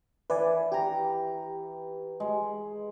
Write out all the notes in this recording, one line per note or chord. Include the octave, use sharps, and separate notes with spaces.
E3 B4 D5 G#5
G4 G5 A#5
G#3